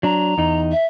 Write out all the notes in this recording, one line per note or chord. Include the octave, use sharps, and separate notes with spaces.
F#3 D4 A#5
E2 D#4
E5